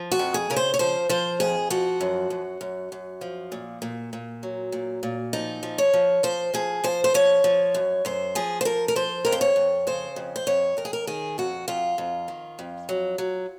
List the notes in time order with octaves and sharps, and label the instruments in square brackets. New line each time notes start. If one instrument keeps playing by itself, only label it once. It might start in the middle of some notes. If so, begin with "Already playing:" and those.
Already playing: [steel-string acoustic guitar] F3
F#4
F2
G#4
C#3 A#4
C5
C#5
F3 C5
F3 C5
F2 G#4
F3 F#4
F#2
F#2
F#2
F#2
F3
A#2
A#2
A#2
F#3
A#2
A#2
F3 D#4
F3
C#5
F3
F3 C5
F3 G#4
F3 C5
C5
F3 C#5
F3
F#2
F#2 C5
F3 G#4
C5
F3 A#4
A#4
F3 C5
F2 A#4
C5
C#5
F2
C#3 C5
F2
C5
F2 C#5
F2 A#4
G#4
A#4
D#3 G#4
F2 F#4
F2 F4
F2
D#3
F2
F#3
F#3